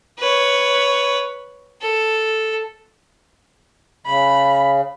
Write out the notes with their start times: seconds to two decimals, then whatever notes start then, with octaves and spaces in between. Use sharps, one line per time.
0.19 B4 C#5
1.82 A4
4.06 C#3 B5